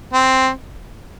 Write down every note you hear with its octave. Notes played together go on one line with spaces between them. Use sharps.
C4